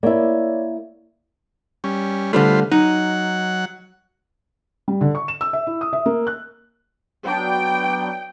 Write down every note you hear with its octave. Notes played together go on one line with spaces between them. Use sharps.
A#3 E4 C#5 D5
G3 C#4
D3 G3 A3 F4 B4 C5
F#3 D#4 F#5
G3
D3
C#6
E7
E6
E5
E4
D#6
E5
A#3
F#6
F#3 B3 D4 G5